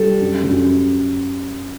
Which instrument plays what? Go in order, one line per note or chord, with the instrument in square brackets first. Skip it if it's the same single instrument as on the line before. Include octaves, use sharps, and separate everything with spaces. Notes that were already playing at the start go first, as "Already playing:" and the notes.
Already playing: [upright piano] G3 [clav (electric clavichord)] A4
[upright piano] F#2
F#2